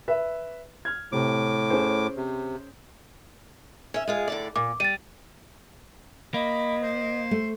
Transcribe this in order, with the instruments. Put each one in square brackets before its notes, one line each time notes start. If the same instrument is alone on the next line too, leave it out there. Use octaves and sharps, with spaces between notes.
[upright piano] B4 E5
F6 G#6
[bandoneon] A2 D6 [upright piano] C3
[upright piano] C#4 G#4 C5
[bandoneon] C3
[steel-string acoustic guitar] C#4 E5
G#3 F4 G#4
A2 D3 D5
[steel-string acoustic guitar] A#2 [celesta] D6
[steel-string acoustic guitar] G3 [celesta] A6 D#7
[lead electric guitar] A#3 [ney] D#5 [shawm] B5
[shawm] C5
[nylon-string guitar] A3